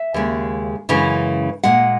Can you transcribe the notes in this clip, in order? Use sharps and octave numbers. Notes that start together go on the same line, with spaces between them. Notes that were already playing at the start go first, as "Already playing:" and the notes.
Already playing: E5
D#2 C#3 G#3
F#2 C#3 E3 G#3
A#2 G#3 F#5